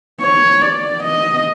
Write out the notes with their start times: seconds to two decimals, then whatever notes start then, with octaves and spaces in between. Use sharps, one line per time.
0.21 C#5
0.62 D5
1.03 D#5